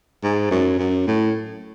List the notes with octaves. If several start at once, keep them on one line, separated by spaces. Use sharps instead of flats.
G#2
F#2
F#2
A2